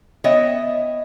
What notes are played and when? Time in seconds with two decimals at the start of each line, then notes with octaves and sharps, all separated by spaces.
0.24 B3 C#5 D#5 E5 G5